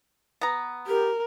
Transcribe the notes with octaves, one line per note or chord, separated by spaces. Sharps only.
B3 A#5
G4 A#4